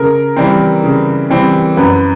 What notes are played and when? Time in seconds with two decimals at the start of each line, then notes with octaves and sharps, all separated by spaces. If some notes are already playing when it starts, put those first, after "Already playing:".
Already playing: C#3 A#4
0.37 E3 G3 C4
0.84 C#3
1.30 E3 G3 C4
1.77 F#2 B4